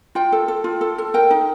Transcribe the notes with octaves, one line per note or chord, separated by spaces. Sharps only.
F4 G5
A4
A4
F4
A4
A4
A#4 G5
D#4